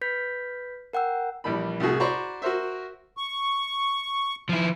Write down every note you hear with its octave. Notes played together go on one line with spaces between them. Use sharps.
B4 G6 B6
A#4 F#5 G5 E6
A#1 E3 G3 A#3 B5
C2 A2 F#4 G#4
F#4 C5 D5 A#5 B5 C#6
F#4 A#4 C5 E5
C#6
F3 E4